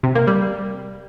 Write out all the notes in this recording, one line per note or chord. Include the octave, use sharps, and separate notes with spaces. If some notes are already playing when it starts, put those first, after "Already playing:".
C3
A#3
G3